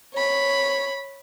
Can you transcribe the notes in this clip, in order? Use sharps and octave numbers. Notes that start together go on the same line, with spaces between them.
C#5 B5